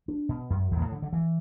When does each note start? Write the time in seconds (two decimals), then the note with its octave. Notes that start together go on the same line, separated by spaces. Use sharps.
0.08 D4
0.29 B2
0.50 F#2
0.71 E2
0.76 B2
0.81 A2
0.92 D3
1.02 D3
1.13 E3